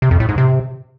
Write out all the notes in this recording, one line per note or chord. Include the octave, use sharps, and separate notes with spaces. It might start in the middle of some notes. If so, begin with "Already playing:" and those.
C3
F2
A2
G#2
C3